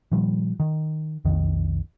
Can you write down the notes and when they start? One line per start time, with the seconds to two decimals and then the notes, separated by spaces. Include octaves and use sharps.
0.11 A#2 D#3 F3 G3
0.60 D#3
1.25 B1 F2 D#3